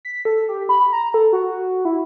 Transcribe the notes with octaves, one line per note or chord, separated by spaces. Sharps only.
B6
A4
G4
B5
A#5
A4
F#4
E4